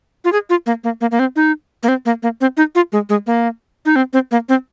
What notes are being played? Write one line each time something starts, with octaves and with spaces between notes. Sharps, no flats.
F4
G#4
F4
A#3
A#3
A#3
A#3
C4
D#4
A#3
C4
A#3
A#3
C4
D#4
F4
G#3
G#3
A#3
D#4
C4
C4
A#3
C4